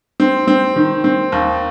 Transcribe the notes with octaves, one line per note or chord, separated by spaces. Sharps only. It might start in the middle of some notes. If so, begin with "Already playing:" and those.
C4
C4
D#3
C4
D#2